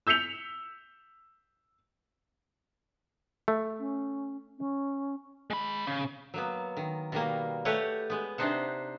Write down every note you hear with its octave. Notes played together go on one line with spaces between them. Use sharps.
E6 G6 B6 C#7 F7
A3
C#4
C#4
G#3 B5
C#3
F#3 A#3 B3
D#3
B2 D#3 G3 A#3
A3 G4 B4 C#5 F#5
G#3 B3
C3 D4 D#4 C5 F#5